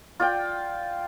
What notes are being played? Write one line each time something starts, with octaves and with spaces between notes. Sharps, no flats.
F4 D5 G5